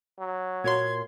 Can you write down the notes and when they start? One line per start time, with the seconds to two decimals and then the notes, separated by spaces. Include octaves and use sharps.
0.19 F#3
0.64 A#2 A#3 F#4 C#5 C6 G#6